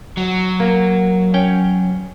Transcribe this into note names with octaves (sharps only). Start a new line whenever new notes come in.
F#3
A#3
C#4 G5